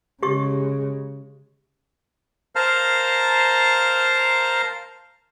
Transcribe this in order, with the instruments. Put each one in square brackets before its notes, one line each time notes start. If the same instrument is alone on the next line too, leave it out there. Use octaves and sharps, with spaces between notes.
[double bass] C#3 G#3 [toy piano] G4 C#6
[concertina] A#4 C5 F5 A5 A#5 F6